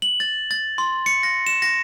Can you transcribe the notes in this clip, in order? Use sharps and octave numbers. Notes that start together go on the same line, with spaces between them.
F#7
A6
A6
C6
C#7
A#6
E7
A#6